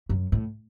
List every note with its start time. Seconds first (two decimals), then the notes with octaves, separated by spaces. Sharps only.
0.09 F#2
0.32 A2